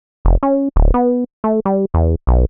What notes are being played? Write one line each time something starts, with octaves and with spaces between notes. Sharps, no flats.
F1
C#4
D1
B3
A3
G3
E2
B1